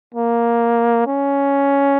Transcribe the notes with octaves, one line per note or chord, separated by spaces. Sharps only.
A#3
C#4